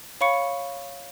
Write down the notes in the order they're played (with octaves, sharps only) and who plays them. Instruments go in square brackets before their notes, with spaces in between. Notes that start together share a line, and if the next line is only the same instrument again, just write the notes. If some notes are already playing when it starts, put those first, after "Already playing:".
[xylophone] C#5 F5 B5 C#6 C#7